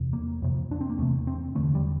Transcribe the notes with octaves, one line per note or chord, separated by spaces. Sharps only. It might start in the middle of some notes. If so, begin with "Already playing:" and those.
Already playing: E2 C3
A#3
F2 C3
D4
C4
A#3
E2 C3 A3
C4
E2 D3 A3
G3